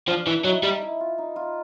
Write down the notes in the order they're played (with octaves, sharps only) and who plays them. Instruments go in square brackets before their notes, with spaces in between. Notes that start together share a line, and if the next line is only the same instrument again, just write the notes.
[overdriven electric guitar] F3 [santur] D4
[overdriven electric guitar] E3
[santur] E4
[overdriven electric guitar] F#3 [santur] D#4
[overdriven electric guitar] G3
[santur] E4
F4
D#4
F4